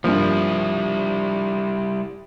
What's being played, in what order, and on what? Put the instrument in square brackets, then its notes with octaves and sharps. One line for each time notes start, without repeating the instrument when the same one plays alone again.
[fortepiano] G2 A#3 [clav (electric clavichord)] F3 [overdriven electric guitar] G3 E4